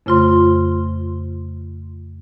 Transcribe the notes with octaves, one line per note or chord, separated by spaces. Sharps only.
F2 C#3 A3 F4 C5 C6